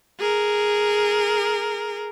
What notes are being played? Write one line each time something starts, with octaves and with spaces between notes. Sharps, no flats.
G#4 A#4